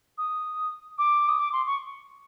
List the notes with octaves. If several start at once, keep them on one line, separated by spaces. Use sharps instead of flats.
D#6
D6
D#6
D6
C6
C#6